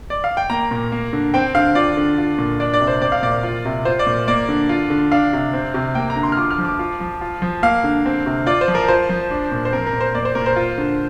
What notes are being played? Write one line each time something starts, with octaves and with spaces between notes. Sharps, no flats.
D5
F5
G5
A#3 A#5
A#2
A#3
D3
C4 G5
D3 F5
F4 D5
D3
F4
A#2
D4 D5
D5
C3
C5
C4 D5
F5
A#2 D5
F4
C3
F4 C5
D5
A#2
A#3 D5
D3
F4
D3
D4 F5
C3
C4
C3
A#3 G5
A#5
D3
C6
F6
F4 D6
F6
F3
D6
F4
F3
F4
F3
A#3 F5
D3
C4
C3
F4 D5
C5
F3
A#4
F4 C5
F3
D4
A#2
C5
C4 A#4
A#4
A#2
C5
A#3 D5
C5
A#2 A#4
C5
F4
D3